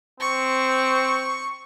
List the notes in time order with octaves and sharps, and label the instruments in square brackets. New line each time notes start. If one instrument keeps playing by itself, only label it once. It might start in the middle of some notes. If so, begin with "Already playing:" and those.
[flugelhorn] C4 [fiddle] C#6